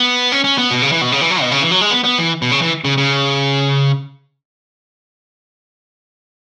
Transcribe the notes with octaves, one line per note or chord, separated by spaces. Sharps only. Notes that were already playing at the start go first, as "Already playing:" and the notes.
Already playing: B3
C#4
C#4
B3
B2
C#3
E3
B2
C#3
E3
F#3
B2
C#3
E3
F#3
G#3
B3
B3
E3
B2
C#3
E3
C#3
C#3